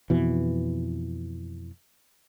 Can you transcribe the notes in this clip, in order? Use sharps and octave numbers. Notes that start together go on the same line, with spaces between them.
F2 B2 E3